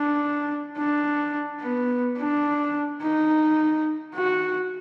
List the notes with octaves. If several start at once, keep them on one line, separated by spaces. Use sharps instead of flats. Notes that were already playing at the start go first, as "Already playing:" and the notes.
Already playing: D4
D4
B3
D4
D#4
F#4